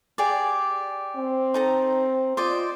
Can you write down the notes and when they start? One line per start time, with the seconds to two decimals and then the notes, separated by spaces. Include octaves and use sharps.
0.18 G4 G#4 D5
1.16 C4
1.54 D#4 A4 A#5
2.37 F4 C5 D5 D#5